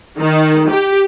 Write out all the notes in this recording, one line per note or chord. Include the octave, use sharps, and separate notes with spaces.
D#3
G4